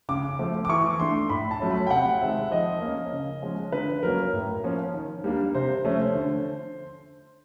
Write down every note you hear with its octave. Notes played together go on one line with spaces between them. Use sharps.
C#3 D6
F3 A3
D6
E3 C#6
A3 D4 C6
A2 B5
A5
F#3 A3 C#4
B5
G5
C3 F#5
D#3 G#3 C4 E5
F3 D#5
A#3 C#4
C#3
F3 G#3 C#4
D3 B4
F#3 A#3 C#4 A#4
A2
F3 A#3 C#4
D#3
G3 A#3 D4
C3 C5
F3 A3 C#4
D3